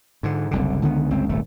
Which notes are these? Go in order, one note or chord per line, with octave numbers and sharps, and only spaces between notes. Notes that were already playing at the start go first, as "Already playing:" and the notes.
G#2 D3
F#1 C2 D3
C#2 D3 D#3 B3
G1 C#2 C4
D#1 G#1 A3